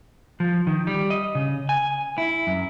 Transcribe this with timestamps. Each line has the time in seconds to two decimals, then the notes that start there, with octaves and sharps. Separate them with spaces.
0.40 F3
0.67 D#3
0.87 G3
1.10 D#5
1.35 C#3
1.69 G#5
2.18 E4
2.47 F#2